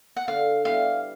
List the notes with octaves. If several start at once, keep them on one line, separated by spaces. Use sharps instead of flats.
F#5
D3 F5
G3 B3 E4 G4 F5